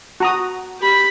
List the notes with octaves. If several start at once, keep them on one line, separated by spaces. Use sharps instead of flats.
F#4 A#5 D#6
G4 B5